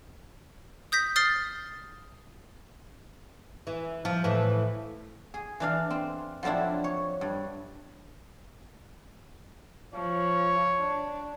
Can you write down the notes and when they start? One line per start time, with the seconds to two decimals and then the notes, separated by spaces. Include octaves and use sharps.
0.92 D#6 G6 A#6 B6
1.16 D#6 F6 A6 C7 G7
3.67 E3
4.05 F3
4.24 A2 E3
5.34 G#4
5.60 E3 D4 F5
5.90 C4
6.43 F3 F#3 C4 D4 E4
6.84 C#5
7.21 G2
9.94 F3 C#5
10.81 D4